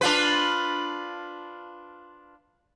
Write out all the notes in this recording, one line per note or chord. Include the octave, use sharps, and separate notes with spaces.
D4 F4 B4